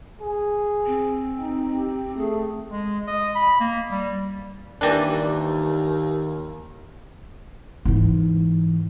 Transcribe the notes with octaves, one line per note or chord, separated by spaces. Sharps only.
G#4
C4
D#4
G4
A3 G#4
G#3
D#5
B5
A#3
G3
D#2 E3 G3 D4 A#4 D5 D6
G#2 E3